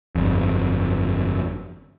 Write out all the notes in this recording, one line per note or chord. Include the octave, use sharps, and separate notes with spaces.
G1 F2